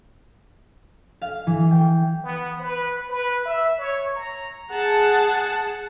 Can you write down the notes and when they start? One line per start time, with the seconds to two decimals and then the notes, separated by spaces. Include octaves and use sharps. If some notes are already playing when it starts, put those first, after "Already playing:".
1.22 F5
1.47 E3
1.71 G5
2.24 B3
2.60 B4
3.10 B4
3.46 E5
3.79 C#5
4.15 A#5
4.71 G#4 F#5 A5